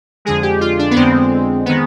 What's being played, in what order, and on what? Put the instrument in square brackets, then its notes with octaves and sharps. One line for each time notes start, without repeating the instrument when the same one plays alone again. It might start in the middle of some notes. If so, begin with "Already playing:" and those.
[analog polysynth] F2 D3 G#3 G#4
G4
F4
D4
B3
F2 D3 G#3 C4
D#3 G#3 B3